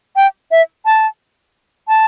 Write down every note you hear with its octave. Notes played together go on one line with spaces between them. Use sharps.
G5
E5
A5
A5